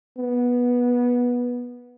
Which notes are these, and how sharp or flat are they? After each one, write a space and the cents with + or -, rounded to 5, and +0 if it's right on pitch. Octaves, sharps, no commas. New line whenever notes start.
B3 -15